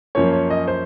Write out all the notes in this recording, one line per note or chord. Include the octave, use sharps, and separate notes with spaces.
F#2 F3 A#3 C#4 C#5
C#5
D#5
C5